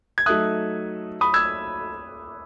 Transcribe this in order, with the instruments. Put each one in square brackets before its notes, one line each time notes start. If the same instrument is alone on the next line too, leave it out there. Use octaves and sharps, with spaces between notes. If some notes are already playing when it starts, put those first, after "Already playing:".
[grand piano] G#6
[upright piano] F#3 A3 D#4 A4 E5 [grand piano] D#6 F#6
[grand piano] B5 D#6
E6 G#6